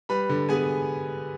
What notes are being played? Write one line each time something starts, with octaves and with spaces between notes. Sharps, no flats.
G3 B4 B5
D3
B3 G#4 G#5